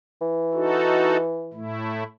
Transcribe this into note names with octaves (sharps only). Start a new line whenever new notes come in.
E3
D#4 F#4 A4
A2 A3 E4